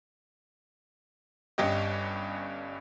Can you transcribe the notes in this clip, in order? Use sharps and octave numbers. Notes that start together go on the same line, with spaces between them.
G1 G2 C#4 G4 D#5